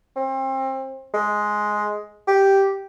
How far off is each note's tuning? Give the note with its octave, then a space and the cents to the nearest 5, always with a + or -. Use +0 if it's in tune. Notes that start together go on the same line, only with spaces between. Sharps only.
C4 +30
G#3 +10
G4 -5